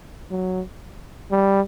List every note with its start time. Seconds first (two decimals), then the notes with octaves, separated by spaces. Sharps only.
0.31 F#3
1.31 G3